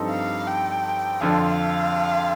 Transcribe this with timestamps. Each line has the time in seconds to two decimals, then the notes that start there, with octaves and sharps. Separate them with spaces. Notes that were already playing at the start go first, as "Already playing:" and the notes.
Already playing: G2 F3 C4 D#4 A4
0.11 F5
0.47 G5
1.21 F2 D3 F3 F5